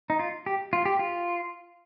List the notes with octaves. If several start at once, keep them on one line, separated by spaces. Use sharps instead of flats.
D#4
F4
G4
F4
G4
F4